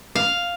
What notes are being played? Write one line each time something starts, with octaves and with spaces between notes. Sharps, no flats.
F5